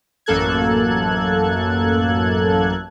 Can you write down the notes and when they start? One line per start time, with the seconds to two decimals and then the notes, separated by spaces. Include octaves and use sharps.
0.26 A1 F#2 A#3 A4 F#6 G#6